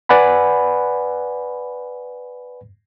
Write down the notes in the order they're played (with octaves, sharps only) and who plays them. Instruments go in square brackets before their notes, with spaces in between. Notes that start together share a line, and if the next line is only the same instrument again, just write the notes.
[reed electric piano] B4 D5 F#5 G#5 B5